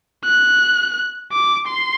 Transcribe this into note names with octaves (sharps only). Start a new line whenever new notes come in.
F#6
D6
C6